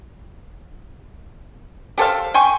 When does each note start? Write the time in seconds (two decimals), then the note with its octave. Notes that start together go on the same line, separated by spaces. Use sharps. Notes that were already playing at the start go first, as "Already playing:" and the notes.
1.98 G4 A4 C5 F5
2.34 G5 G#5 C6 C#6